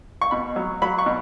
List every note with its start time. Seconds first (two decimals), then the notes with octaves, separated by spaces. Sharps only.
0.22 C#6
0.31 B2 B5
0.56 F#3
0.82 F#3 B5
0.98 C#6
1.06 B2